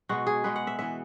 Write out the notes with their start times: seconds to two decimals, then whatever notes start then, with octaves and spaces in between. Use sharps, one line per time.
0.09 B2 G#3 B3 F#4
0.27 G#4
0.44 B2 G#3 B3 B4
0.56 F#5
0.67 E5
0.79 E3 B3 E5